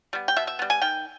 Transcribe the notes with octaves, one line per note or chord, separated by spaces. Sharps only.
G3 B3
G5
B2 E5
E5
G3 B3
G#5
D#3 G5